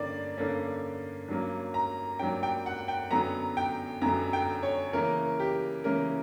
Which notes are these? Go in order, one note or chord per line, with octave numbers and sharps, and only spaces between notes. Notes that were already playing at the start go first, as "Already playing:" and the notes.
Already playing: G2 D3 A#3 C#4 D5
G2 D3 A#3 C#4
G2 F#3 A#3 C#4
A#5
G2 F#3 A#3 C#4 G5
G5
F#5
G5
F#2 D3 F#3 B3 A#5
G5
F#2 D3 F#3 B3 A#5
G5
C#5
C#3 E3 A#3 C#4 A#4
G4
C#3 E3 A#3 C#4 A#4